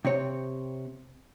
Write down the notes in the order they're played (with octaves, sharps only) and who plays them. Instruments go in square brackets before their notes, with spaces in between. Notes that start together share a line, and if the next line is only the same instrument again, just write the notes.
[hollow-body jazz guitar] C3 C4 C#5